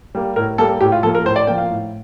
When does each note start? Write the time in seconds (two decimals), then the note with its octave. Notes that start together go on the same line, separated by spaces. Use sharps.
0.15 G3 A#3
0.36 A2 A#4
0.58 G3 A#3 A4
0.81 A2 G4
0.92 F4
1.03 F3 A#3 A4
1.15 A#4
1.25 A2 C5
1.36 D5
1.47 A#3 G5
1.50 F3
1.58 F5
1.70 A2